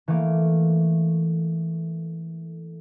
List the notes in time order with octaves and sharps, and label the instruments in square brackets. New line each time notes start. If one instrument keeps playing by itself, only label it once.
[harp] E3 A3 A#3 F5 D6